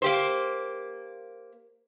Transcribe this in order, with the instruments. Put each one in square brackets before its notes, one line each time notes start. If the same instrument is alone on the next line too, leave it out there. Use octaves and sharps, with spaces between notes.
[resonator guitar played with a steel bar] A#3 G4 C5